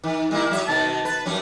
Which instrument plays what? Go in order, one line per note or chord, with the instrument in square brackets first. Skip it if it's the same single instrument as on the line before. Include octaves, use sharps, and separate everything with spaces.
[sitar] D#3
G3 A#3 E4
F#3 E5
[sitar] B2 D#3 [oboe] A5
[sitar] B4
F#2 G3 C#4